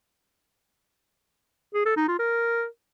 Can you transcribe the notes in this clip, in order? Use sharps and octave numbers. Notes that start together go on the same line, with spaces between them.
G#4
A4
D#4
F4
A#4